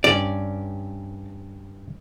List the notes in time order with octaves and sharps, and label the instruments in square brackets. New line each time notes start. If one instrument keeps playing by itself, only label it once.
[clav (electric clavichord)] G2 C#4 [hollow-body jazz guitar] D5